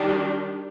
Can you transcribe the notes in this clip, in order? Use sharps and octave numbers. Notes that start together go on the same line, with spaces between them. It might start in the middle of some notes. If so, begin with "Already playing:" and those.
Already playing: D#3 G3 D4 G4